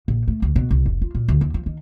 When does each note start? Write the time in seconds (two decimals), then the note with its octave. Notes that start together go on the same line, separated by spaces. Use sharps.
0.08 A#1
0.28 A3
0.42 D2
0.56 B2
0.71 C2
0.86 F1
1.02 F4
1.15 A#2
1.28 D2
1.41 D#2
1.54 F3
1.66 D#3